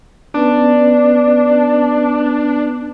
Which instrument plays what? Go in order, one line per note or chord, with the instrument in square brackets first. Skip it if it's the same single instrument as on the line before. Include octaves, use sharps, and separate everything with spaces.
[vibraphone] B3 C#4 B4 [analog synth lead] D4